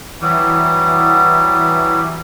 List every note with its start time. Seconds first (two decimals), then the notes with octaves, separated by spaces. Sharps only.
0.21 E3 F#3 G3